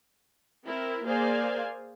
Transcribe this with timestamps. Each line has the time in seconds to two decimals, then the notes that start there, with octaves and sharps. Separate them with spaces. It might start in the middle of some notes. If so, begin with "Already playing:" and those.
0.67 C4 E4 A#4
1.05 A#3 G#4 C5 D5 F5 G#5